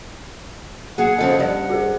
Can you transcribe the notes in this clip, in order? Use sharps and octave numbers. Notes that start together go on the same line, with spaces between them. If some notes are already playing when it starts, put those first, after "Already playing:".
F#3 A#3 G#4 F#5
C#3 F3 C#4 A4 D#5
G2 G4 D5 F#5
F#4 G#4 C5